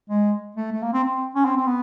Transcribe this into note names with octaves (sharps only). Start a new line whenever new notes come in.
G#3
A3
A3
A#3
C4
C4
C#4
C4
C4
B3